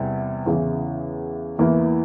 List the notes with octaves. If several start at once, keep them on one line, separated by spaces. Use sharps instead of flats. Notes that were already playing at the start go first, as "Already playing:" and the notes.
Already playing: E2 C3 G3
E2 C#3 E3
E2 E3 A#3 E4